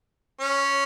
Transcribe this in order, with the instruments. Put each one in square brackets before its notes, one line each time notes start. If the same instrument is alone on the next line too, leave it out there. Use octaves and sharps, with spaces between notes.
[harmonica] C#4